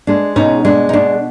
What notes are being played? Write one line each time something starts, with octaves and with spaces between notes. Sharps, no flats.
G#3 D4
B2 C#4 D#4
G#3 D4
D#4
B2 D4